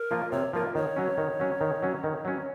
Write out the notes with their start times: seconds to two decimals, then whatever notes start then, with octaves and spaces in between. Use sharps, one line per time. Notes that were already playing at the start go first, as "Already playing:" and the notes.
Already playing: A#4
0.11 F3 A#3 F4
0.32 C3 C#5
0.53 F3 A#3 F4 A#4
0.75 D#3 C#5
0.96 F#3 C#4
1.18 D#3
1.40 F#3 C#4
1.61 D#3
1.83 F#3 C#4
2.04 D#3
2.25 F#3 C#4